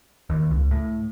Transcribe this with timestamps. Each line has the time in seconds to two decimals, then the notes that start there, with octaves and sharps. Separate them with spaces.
0.30 D#2
0.51 C#2
0.71 A2